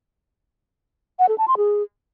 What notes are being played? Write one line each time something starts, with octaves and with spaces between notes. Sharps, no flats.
F#5
A4
A5
C6
G#4